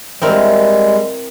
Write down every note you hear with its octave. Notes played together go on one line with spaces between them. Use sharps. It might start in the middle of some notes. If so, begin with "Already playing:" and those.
G3 G#3 C4 E4 A#4